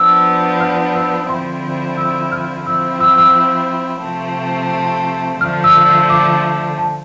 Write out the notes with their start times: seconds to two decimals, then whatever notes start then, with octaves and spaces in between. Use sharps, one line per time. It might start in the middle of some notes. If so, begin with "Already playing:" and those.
Already playing: F3 B3 D4 E6
0.60 F6
0.95 E6
1.29 D3 F3 C4 E4 C6
1.97 E6
2.32 F6
2.66 F3 C4 E4 E6
3.00 E6
3.18 E6
4.03 C3 F3 A3 C4
5.41 D3 F3 A3 F6
5.64 E6
5.86 E6
6.10 D6
6.78 A5